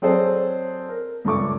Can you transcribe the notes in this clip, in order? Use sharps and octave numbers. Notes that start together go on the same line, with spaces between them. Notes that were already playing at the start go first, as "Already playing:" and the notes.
F#3 C4 G#4 A4 C5 D5
A#4
C#2 G2 A4 C#6 D6